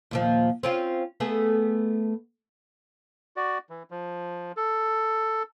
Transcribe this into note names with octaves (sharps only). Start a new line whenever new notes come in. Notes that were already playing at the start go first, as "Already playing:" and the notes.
D#2 A#2 F3
C4 C#4 F4
A3 B3 G#4
F#4 D5
E3
F3
A4